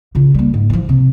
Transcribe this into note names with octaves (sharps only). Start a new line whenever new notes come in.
C#3 F4
G3 A#3
G#2
E3 F3
C3